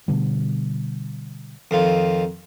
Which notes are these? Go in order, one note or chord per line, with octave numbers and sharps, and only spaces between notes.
B2 D3 G3
F2 D#3 F4